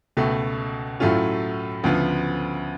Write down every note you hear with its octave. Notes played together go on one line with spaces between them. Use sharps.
C#2 B2 A3
A2 F#3 A3 C#4 F4
D2 C#3 F3 B3 F4